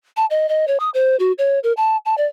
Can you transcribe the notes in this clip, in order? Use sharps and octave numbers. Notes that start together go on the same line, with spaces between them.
A5
D#5
D#5
C#5
D#6
C5
F#4
C#5
A#4
A5
A5
D5